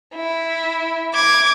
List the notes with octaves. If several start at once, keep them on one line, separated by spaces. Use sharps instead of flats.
E4
D6 G#6